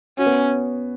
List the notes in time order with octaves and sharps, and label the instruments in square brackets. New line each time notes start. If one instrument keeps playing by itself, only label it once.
[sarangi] C#4 [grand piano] F#4
[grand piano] B3